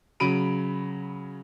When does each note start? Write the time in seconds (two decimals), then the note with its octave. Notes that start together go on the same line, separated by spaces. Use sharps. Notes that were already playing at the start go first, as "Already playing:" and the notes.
0.20 C#3 F#3 B5 D7 D#7